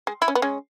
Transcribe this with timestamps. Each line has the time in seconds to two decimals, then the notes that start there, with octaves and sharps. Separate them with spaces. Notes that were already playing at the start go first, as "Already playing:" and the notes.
0.07 G#3
0.22 E4
0.28 C#4
0.35 B3
0.42 G#3 C#4